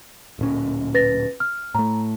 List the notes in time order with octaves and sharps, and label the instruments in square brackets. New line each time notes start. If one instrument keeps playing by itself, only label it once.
[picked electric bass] D1 A#2 C#4
[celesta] B4 A6 A#6
F6
[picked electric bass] A2 A3 [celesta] A#5